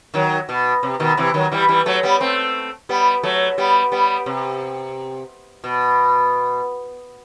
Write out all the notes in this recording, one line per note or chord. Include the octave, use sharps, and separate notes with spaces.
D#3 F#3
B2
C3
B2 D#3
C3 E3
D#3 F#3
E3 G3
E3 G3
F#3 A3
G3 B3
A3 C4
G3 B3
F#3 A3
G3 B3
G3 B3
C3
B2